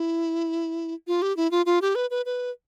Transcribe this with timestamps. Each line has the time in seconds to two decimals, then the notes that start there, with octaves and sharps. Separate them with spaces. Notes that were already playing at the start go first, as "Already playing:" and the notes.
Already playing: E4
1.07 F4
1.22 G4
1.37 E4
1.51 F4
1.66 F4
1.82 G4
1.95 B4
2.10 B4
2.26 B4